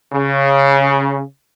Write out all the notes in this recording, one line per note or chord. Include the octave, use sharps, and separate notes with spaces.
C#3